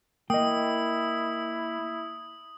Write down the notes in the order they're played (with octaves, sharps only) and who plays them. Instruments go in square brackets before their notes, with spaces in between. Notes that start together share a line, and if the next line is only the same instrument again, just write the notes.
[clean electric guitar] A#3 [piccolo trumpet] E4 [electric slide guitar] D#5 G5 [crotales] D#6